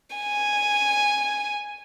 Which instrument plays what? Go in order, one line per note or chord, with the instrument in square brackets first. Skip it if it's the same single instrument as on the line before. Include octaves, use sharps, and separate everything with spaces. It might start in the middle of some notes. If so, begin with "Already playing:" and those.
[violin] G#5